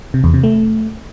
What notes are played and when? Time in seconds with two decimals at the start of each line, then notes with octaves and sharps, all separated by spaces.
0.14 C3
0.24 E2
0.34 C3
0.43 A3